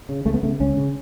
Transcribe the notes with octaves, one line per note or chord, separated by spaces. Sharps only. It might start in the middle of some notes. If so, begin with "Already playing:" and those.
C#3
C#2 A3
B3
C#3 A3
C#2 C#4
C#3